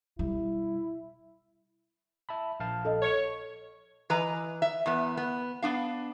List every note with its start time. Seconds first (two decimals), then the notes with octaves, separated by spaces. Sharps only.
0.19 B2 G3 E4
2.29 E5 A5 B5
2.60 A#1 F5 A5
2.85 A4 D#5
3.02 C#5
4.10 E3 B4 D#5 A#5
4.62 E5
4.86 E2 B3
5.17 B3
5.62 B3 D4 F5